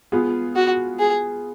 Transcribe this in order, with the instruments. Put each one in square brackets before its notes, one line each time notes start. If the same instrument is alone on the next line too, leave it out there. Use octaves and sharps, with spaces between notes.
[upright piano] B3 F4 G#4
[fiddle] F#4
G#4